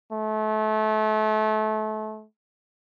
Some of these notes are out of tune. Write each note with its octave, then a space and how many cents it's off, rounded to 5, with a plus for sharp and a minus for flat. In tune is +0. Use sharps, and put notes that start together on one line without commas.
A3 -30